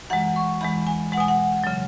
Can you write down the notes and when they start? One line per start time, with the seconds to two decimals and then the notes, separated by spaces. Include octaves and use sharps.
0.10 F#2 E3 G#3 F#5
0.36 C#6
0.61 E2 E3 G#3 B5
0.87 G#5
1.12 G#3 F#5
1.17 B2 G#5
1.28 F#5
1.64 C#3 F#3